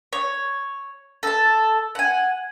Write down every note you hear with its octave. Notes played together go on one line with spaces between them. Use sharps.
C#5
A4 A5
F#5 G#5